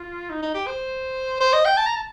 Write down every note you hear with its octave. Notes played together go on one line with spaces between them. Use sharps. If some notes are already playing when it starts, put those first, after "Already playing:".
Already playing: F4
D#4
D#4
G4
C5
C5
D#5
G5
A5
A#5
A5